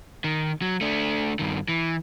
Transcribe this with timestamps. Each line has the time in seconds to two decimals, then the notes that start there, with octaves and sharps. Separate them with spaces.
0.24 D#3
0.62 F#3
0.81 A3 D4
1.39 G2 D#3
1.68 E3